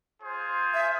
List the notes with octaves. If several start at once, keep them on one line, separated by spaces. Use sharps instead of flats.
F4 G#4 C5
E5